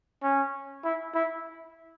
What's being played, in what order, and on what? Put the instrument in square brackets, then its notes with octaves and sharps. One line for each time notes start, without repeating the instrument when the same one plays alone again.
[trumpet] C#4
E4
E4